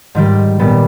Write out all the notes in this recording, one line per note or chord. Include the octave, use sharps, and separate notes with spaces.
G#2 D#3 G3
A#2 G3 B3